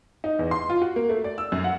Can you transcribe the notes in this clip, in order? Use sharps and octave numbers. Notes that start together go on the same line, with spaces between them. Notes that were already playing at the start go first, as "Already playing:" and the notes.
D#4
E2
C6
F4
F#4
A#3
A3
D5
E6
F#2
F#5